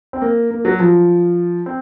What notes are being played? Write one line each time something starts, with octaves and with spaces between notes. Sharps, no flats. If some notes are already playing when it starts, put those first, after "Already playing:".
C4
A#3
A#3
F#3
F3
C4